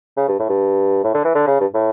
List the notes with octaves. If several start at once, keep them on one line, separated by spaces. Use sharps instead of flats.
C#3
G2
A2
G2
A2
D3
E3
D3
C#3
G2
A2